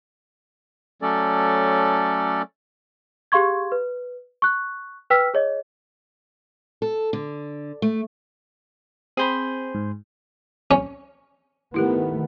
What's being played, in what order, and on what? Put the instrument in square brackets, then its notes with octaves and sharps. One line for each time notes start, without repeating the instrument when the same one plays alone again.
[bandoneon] F#3 A3 C#4 A4 D5
[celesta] G4 G#4 F5 C6 C#6 G#6
B4
C#6 F#6
B4 G5 E6 F6 B6
G#4 C#5 D#5
[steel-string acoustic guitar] A4
D3
A3
[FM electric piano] C4 [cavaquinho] G#4 C5 B5
[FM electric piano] G#2
[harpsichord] C#4
[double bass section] D#3 A3 B3 [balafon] E4 G4 A#4